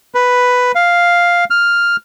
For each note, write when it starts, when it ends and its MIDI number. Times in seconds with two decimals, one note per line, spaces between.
0.15 0.72 71
0.75 1.44 77
1.50 1.96 89